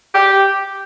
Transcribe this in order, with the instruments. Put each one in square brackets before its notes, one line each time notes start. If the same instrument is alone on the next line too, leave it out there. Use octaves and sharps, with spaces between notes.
[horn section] G4